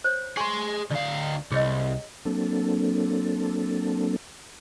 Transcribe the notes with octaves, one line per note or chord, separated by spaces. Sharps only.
C5 C#5
G#4 G#5 C6 C#6
D2 D5 F5
C2 G#4 C#5 D#5
F#3 A#3 C4 D4 A4